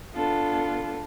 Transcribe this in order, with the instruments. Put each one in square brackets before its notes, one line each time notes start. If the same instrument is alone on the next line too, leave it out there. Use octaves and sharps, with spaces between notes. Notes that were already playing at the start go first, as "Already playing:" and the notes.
[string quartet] B3 D4 F4 A4